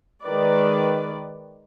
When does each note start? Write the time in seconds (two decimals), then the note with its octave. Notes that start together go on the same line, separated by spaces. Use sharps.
0.24 D#3 G#3 B4 D5